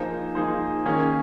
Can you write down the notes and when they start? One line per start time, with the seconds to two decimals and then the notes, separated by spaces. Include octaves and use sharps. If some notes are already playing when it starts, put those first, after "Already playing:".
Already playing: F3 A#3 D#4 G#4 C5
0.35 F3 A#3 D#4 G#4 C5
0.85 D#3 A#3 C#4 G#4